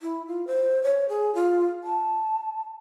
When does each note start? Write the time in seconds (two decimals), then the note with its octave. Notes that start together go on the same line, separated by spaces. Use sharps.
0.01 E4
0.28 F4
0.47 C5
0.84 C#5
1.09 G#4
1.35 F4
1.84 A5